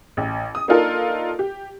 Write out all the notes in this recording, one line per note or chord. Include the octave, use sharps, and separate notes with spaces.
A1
D#6
A#3 D4 D#4 F4 A4 A#4
G4